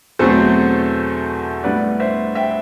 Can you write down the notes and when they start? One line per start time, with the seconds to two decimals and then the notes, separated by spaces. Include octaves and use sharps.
0.19 E2 B2 F#3 A3 C4 A4 C5
1.64 A2 G3 B3 B4 D5
2.00 C5 E5
2.35 E5 G5